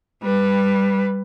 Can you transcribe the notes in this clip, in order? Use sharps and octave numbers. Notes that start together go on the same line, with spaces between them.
G3 B4